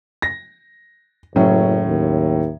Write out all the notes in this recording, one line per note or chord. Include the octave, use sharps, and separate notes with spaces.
A#6
F#1 A2 F#3 C#4
D#2